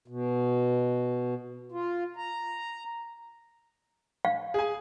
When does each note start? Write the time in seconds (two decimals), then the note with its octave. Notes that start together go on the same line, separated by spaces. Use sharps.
0.08 B2
1.72 F4
2.16 A#5
4.25 F5
4.54 G#4 G#5